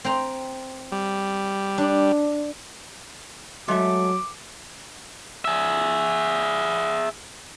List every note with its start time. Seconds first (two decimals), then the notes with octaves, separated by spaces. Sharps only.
0.04 C4 G5 A#5
0.92 G3
1.78 D4
3.68 F#3 G#3 A3 E5 D6
5.45 G#4 E5